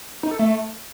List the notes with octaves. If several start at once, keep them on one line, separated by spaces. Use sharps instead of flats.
D#4
A4
A3